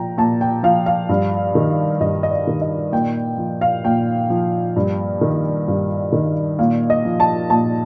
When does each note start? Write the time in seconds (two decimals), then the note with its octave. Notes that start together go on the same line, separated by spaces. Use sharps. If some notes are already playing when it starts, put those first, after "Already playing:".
Already playing: A#2 F3 G5 A#5
0.18 A#2 A5
0.41 G5
0.63 F3 F5
0.86 F5
1.09 G2
1.55 D#3
2.00 G2 D#5
2.23 D#5
2.31 D5
2.47 D#3
2.61 D#5
2.92 A#2 G5
3.38 F3
3.61 F5
3.84 A#2 G5
4.30 F3
4.76 G2
5.21 D#3
5.68 G2
6.12 D#3
6.59 A#2 F5
6.90 D#5
7.05 F3
7.20 A5
7.50 A#2 A5